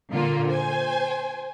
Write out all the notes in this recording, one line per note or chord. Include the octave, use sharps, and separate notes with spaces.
A#2 D3 A#3 F4
C5 G#5